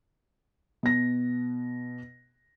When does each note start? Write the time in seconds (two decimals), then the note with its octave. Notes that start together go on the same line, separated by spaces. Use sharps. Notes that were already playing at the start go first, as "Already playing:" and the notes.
0.83 B2 A#6